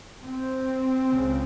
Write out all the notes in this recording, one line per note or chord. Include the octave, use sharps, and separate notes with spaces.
C4
C#2 C#3